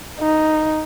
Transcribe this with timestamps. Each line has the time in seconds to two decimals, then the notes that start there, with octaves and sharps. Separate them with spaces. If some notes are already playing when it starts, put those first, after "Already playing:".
0.20 D#4